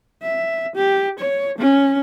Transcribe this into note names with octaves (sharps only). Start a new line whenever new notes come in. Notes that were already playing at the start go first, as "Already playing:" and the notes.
E5
G4
C#5
C#4